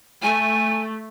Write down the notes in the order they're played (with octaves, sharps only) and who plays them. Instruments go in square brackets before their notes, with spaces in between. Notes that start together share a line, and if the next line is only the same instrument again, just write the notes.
[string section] A3 [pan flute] G#5